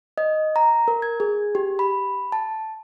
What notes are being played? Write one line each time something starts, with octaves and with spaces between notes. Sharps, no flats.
D#5
A#5
A#4
G#6
G#4
G4
B5
A5